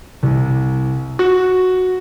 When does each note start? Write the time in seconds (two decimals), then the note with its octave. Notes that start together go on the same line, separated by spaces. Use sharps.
0.23 C2
1.19 F#4